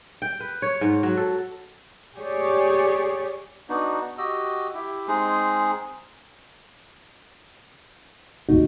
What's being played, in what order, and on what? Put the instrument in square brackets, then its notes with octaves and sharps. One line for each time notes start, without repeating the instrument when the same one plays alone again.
[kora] G5
B4
C#5
G#2
F#3
A4
[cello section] G4 G#4 C#5 D5
[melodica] B3 D4 D#4 F#4
F#4 G4 D#5 E6
E4 G4
G#3 C4 D#4 G#4
[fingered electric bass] D#2 A2 C3 [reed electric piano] D#4 F#4